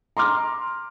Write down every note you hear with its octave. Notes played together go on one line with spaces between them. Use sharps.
A#5 C6 D6 F6